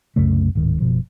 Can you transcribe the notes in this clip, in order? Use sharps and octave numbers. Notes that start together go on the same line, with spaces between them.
C2 F#2 C#3 A3
D1 G#2 D#3
F#1 B2 F3